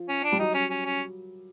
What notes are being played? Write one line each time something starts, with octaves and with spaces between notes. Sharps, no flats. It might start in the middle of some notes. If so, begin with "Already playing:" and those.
Already playing: F3
C#4
D4
G3
F#3 D#4
C#4
C#4
C#4